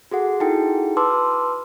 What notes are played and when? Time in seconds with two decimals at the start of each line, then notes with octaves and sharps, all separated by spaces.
0.11 F#4 G#4 A4 F#5
0.40 D#4 E4 F#4 G#4 A4 G5
0.97 B4 A5 C6 D6 E6